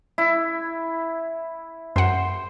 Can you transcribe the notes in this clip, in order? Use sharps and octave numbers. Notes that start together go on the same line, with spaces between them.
E4
F#2 C5 F#5